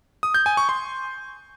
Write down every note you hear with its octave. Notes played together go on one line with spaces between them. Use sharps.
D#6
G6
G#5
C#6
C6